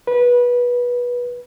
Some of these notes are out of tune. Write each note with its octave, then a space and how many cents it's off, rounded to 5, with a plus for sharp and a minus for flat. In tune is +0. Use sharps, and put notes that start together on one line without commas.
B4 -20